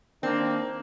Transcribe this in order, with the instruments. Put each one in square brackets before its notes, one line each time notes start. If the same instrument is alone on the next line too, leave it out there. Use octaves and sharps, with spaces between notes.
[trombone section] D#3 A#3 D4 [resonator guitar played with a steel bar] C4